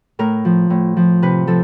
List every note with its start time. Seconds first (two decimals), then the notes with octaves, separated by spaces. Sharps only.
0.19 A2 A#4
0.45 F3
0.70 A2
0.97 F3
1.22 C3 B4
1.47 F3 A4